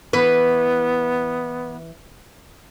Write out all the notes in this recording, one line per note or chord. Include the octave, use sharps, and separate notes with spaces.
E3 B3 B4